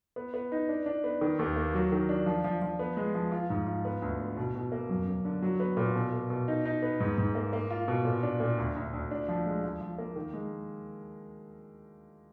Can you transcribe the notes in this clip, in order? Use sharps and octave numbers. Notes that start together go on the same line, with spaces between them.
B3
B3
D#4
D4
D4
B3
D#3
D#2
A#3
F#3
D#3
D4
F3
F3
F3
B3
G#3
F3
F4
G#2
F4
B3
D2
B3
B2
B2
A#3
F#2
F#2
D3
F#3
B3
A#2
B2
A#3
B2
D#4
D#4
B3
G#2
G#2
A#3
A#3
F4
B2
A#2
D4
A#2
D2
D2
D2
D4
F3
G#3
F3
F3
A#3
D#3
G#3